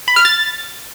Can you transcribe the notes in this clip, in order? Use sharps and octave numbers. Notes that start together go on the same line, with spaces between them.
B5
F6
A6